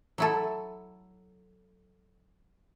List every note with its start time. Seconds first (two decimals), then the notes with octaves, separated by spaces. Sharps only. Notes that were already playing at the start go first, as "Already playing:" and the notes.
0.18 F#3 E4 A4